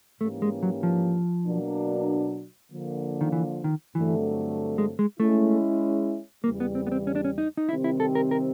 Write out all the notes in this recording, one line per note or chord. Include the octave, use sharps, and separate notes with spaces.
G#2 E3 G3 A3 A#3 C#4
G#3
F#3
F3
B2 F#3 A#3 D4
D3 F3 A#3
D#3
E3
D#3
G2 D3 E3 F#3 A3 C4
G#3
G#3
G#3 A3 C#4 E4
E2 C#3 E3 G3 A#3
B3
C4
B3
C4
C#4
D4
C#4
D#4
D#4
C3 D#3 G3 C4 E4
E4
A4
A#4
A#4